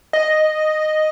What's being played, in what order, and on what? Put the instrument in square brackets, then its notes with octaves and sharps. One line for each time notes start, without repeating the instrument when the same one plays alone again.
[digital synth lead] D#5